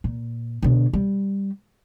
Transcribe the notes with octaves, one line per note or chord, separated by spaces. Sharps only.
A#2
B2 D3
G3